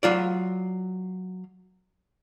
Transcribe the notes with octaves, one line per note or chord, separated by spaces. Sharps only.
F#3 F4 D5